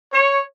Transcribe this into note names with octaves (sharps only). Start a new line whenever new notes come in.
C#5